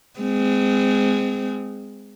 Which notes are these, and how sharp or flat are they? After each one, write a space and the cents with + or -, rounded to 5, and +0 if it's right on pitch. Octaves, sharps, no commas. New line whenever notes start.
G#3 -10 C4 -30